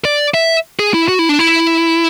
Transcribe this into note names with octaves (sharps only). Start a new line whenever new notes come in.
D5
E5
G#4
E4
F#4
E4
D4
E4